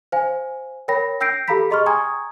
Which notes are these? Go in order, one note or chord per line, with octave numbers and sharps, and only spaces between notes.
C5 F5 G#5
A#4 C#5 G5 B5 A#6
G5 E6 G6 A#6 C7 D7
G4 A4 F5 A#5 B5 B6
G#4 D#5 C6 C#6 F6
G5 G#5 A#5 C#6 D#6 G#6